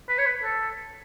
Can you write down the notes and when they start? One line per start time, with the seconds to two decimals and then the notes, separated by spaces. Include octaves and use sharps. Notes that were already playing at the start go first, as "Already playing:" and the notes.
0.09 B4
0.18 C#5
0.26 B4
0.43 A4